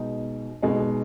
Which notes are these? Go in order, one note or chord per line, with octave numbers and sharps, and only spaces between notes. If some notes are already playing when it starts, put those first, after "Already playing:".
Already playing: B2 G#3 D#4
B2 G#3 D#4